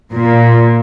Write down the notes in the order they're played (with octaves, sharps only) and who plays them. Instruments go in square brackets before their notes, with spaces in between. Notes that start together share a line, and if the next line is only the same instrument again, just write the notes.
[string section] A#2